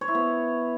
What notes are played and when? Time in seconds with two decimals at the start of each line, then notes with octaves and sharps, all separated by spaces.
0.01 C#5
0.08 E4
0.15 B3